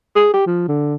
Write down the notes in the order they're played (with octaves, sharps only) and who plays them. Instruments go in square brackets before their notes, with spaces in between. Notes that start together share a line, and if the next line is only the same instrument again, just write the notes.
[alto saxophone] G#4
G4
F3
D3